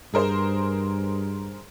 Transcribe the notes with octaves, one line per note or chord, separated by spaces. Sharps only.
G2 G#4 A#4 C5